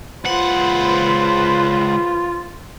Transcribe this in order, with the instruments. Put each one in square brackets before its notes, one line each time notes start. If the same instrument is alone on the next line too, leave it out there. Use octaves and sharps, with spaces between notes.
[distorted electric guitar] C#2 F#5 [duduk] F4 [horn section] B4 C5